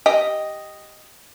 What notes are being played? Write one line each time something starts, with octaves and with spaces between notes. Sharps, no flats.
G4 D#5